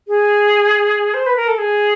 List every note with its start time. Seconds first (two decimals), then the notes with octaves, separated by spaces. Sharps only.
0.08 G#4
1.14 C5
1.26 B4
1.36 A#4
1.48 A4
1.58 G#4